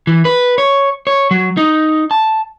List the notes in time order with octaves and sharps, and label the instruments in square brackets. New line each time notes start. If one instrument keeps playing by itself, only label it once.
[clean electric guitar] E3
B4
C#5
C#5
F#3
D#4
A5